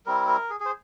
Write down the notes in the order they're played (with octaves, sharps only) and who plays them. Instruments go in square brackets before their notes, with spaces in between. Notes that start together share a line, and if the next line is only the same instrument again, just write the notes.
[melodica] G3 C4 E4 A#4
A#4
G#4
G#4
C5